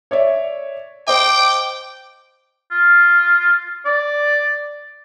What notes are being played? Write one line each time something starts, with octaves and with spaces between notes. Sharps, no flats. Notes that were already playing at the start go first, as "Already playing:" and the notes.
C#5 D5 E5
C5 D#5 G5 D6
F4
D5